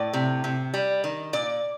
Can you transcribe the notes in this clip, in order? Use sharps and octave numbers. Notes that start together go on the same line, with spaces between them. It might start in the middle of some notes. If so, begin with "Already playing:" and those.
Already playing: A2 A3 D5
C3
C3
G3
D#3
A#2 D5